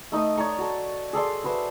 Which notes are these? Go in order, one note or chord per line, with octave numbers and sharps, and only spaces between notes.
A3 D#4 D#5 D#6
C#5 D5 A#5 C#6
F#4 A4
G#4 A4 D5 C6
F#4 B4 C5 E5